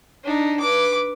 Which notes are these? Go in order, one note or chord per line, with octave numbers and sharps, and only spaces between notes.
D4 D#4
B4 D6